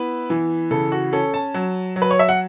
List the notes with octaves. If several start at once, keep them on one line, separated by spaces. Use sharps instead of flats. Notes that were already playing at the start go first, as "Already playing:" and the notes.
Already playing: B3 E4 B4
E3
C#3 A4
F#4
C#4 A4
A5
F#3
F#3
B4
C#5
E5
F#5